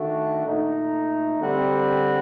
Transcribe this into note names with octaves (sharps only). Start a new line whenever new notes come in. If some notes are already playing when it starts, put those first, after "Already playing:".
Already playing: D#3 A3 D4 F#4
A#2 A3 D#4
D3 G3 C4 F#4